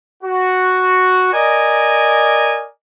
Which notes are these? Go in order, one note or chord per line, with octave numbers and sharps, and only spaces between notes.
F#4
A#4 D5 D#5 G#5